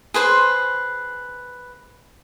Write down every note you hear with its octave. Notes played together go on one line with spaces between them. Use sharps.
G#4 B4 C5 C6